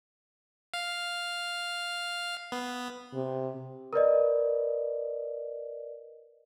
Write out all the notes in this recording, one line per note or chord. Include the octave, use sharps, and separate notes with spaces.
F5
B3
C3
A#4 B4 D5 D#5